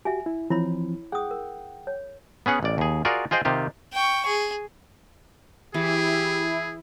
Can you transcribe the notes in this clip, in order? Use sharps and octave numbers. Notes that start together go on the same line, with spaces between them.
F#4 G4 E5 G#5
E4
E3 F3 C4 E4 C#5 B5
G#4 F#5 G5 D#6
A#4
C#5
B3 C#4 G#4 F#5
A1 D5
D#2 G#4
F4 F#4 G#4 A#4 D5
F4 G#4 C5 D#5 G5
C3 D#3 F4 G4
G5 C#6
G#4
E3 E4 G4 G#4